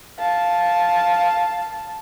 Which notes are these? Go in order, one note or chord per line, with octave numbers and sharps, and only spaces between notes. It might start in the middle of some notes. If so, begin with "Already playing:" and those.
F5 A5